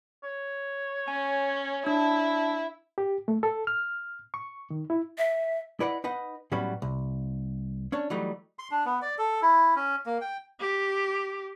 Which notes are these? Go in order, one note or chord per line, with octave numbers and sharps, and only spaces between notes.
C#5
C#4 G#5
D4 E4
G4
A3
A4
F6
C#6
D#3
E4
E5
E4 B4 D5 D#5 F#5
D#4 B4 D#5 F#5
A2 F#3 G3 B3 C#4 F#4
C2
C#4 D4 C#5
E3 F#3 G3 A3 D#4
C6
D4
B3
D5
A4
E4
C#4
A#3
G5
G4